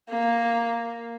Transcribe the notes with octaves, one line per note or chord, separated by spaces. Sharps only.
A#3